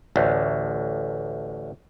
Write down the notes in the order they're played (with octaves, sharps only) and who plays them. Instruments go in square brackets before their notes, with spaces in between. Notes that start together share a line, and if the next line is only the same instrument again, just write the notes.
[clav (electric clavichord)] A1 D2